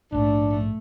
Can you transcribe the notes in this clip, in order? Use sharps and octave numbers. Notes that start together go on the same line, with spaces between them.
A#1 G#2 A3 D4